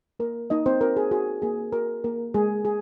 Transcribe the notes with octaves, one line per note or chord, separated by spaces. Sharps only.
A#3 A#4
A#3 D#4 D#5
C4 C5
F#4 A#4
G#4
F#4 G#4
A#3 G#4
F#4 A#4
A#3 A#4
G#3 G#4
G#3 G#4